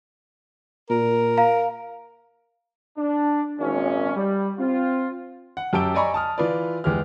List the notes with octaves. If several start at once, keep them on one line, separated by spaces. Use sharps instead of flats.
A#2 A#4
F5 A#5
D4
G#1 A#2 C#4
G3
C4 F4
F#5
F#2 G4 A5 E6 D7 G7
D5 D#5 G#5 A#5 B5 C#6
A5 D#6 F6
E3 F4 B4 D5
E2 G#3 G4 F6